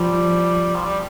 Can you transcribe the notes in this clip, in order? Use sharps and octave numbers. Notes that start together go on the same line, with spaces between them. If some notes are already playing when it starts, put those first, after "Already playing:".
Already playing: F3 G3
F3
G3